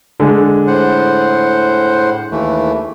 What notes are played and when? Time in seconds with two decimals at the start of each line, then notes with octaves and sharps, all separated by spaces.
0.20 D3 G#3
0.67 A2 C5 F#5
2.31 D#2 E3 A3